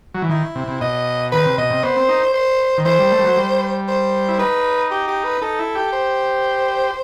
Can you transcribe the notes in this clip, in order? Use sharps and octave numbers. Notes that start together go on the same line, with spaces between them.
F#3
E3
D#3 E4
C3
C3
B2 D#5
D#3 B4
C3
B2 D#5
C3
B3 C5
C4
D#4
C5
D#3
E3 C5
G3
A3
G3
F#3
G3
C5
E4
D#4 B4
G4
G4
B4
D#4 A4
E4
G4
C5